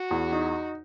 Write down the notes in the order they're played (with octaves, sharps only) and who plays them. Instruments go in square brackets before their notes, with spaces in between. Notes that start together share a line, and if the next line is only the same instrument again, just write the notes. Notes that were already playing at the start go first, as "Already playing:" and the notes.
Already playing: [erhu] F#4
[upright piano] E2
D#4